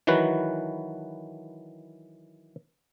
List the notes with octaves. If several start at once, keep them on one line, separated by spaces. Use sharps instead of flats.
D#3 E3 F#3 F#4 B4